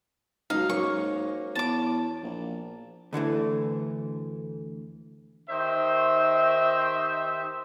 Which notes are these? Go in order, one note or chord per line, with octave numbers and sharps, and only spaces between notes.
C#2 F#3 D#4 F5
G#2 F#3 A#3 C#4 C#6
E2 A5 D6
A#1
D2 D3 E3 A3
D#3 D#4 G4 C5 E5